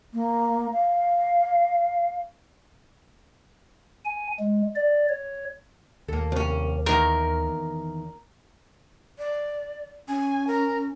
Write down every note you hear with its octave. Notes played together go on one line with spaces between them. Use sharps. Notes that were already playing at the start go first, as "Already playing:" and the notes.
A#3
F5
G#5
G#3
D5
C#5
D#2 A#3 A4
C2 C#4
E2 D#3 A#4
D5
C#4 G#5
A#4